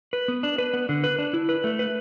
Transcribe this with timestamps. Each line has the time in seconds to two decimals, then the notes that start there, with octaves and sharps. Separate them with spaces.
0.13 B4
0.28 B3
0.43 D4
0.58 B4
0.74 B3
0.89 D3
1.04 B4
1.19 D4
1.33 E4
1.49 B4
1.64 A3
1.79 B4